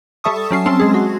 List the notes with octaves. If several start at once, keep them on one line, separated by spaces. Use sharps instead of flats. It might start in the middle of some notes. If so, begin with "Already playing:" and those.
G3 A4 E5 A5 C#6 D#6
F#3 C#4 C7
C4 C#4 A5 C6
G#3 G#4
F#4